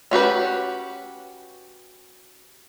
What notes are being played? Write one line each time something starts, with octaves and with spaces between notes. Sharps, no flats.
C#4 F#4 G4 B4